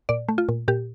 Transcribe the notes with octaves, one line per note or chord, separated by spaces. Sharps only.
A#2 D5
A3
F4
A#2
A#2 G4